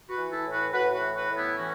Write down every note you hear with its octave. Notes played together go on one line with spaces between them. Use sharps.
F#4 B4
E3
E4 A4
A2
F#4 B4
A2 F#4 B4
F#4 B4
E3
F#4 B4
A2
B3 E4
E3 C#4 F#4